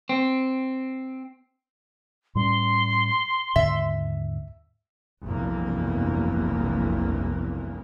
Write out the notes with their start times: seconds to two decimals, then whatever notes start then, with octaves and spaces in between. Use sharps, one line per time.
0.09 C4
2.35 A2 G3 C#4 C6
3.56 D#2 G#2 D3 E5
5.24 F1 B1 E2 G2 E3 A#3